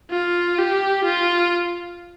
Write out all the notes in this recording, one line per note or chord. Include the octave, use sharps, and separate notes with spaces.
F4
G4
F4